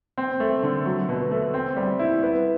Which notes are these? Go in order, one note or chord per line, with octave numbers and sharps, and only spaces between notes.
C4
A3
D3
F#3
B2
A3
C4
G3
E4
B3